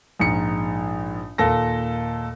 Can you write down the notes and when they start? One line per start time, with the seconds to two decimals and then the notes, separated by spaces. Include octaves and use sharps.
0.20 A#1 G#2 C#7
1.38 D#2 A#2 A4 A#6